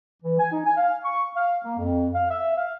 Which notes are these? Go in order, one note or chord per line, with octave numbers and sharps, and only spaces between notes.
E3
G#5
D#4
G#5
F5
C#6
F5
A#3
F2
F5
E5
F5